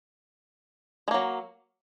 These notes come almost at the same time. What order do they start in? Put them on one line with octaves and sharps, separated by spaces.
G#3 A#3 F#3